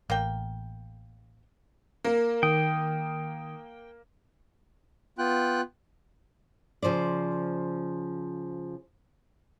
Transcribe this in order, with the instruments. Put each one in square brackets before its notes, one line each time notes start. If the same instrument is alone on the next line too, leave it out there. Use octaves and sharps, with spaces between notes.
[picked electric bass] A1 [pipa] A#3 G5
[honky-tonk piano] A#3 [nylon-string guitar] A#4
[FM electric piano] D#3 D#6 [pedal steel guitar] G5
[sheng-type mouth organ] B3 F4 G5 F#6
[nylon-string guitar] C#3 F3 C5 D5